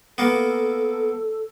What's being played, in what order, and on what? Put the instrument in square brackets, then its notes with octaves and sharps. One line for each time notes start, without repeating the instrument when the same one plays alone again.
[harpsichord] A#3 B3 [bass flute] A4